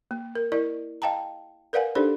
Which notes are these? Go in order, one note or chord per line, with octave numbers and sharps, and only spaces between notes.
A#3
A#4
E4 A#4 D5 D#5
D#5 F5 G5 A5 A#5
A#4 B4 D5 F5 F#5 G#5
D4 D#4 G4 A4 C5 D5